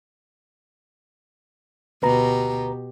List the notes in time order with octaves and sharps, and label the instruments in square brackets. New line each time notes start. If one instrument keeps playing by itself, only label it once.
[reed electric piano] D2 B4 A#5 [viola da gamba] B2 G4